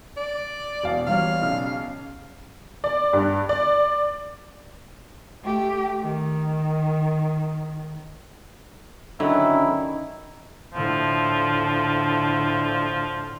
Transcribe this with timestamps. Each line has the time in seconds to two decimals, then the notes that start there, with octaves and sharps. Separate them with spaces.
0.17 D5
0.83 E1 F5
1.07 E2 G3 C#5 F5
1.42 B1 C#3 F6
2.84 D5
3.13 G2
3.49 D5
5.43 A3 G4
6.02 D#3
9.20 D3 D#3 F#3 C#4 E4
10.74 A2 D3 F3